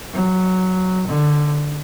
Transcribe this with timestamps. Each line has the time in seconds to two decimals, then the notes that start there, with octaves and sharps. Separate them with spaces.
0.13 F#3
1.07 D3